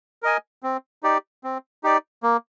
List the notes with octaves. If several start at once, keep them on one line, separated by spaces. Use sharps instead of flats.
A#4 D#5 G#5
C4
D#4 G4 D5
C4
D#4 G4 D5
A#3